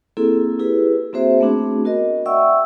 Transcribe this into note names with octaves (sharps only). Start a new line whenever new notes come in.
A#3 C4 E4 G#4 A4
E4 G4 G#4 B4
A#3 C4 F#4 G#4 C5 E5
A3 B3 C4 D4 F#4 G#4
B3 F#4 A#4 D#5
D5 E5 F#5 G5 C#6 E6